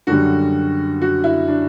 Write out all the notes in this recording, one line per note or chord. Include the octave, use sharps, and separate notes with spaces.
F#2 D3 G3 F#4
F#4
E4
D4